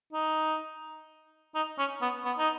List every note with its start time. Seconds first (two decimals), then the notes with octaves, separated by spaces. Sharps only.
0.13 D#4
1.55 D#4
1.78 C#4
2.02 B3
2.25 B3
2.38 D#4